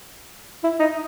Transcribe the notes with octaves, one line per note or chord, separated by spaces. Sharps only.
E4
D#4